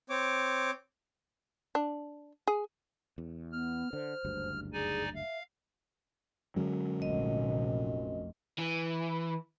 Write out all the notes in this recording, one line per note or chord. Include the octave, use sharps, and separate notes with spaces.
C4 C#5 D6
D4
G#4
E2
B3 F6
D3 C5
F#1 D2 G2
D#4 G#4 D5 G#5
E5 F5
F#2 D3 F#3 G#3
F1 A#1 D#5
E3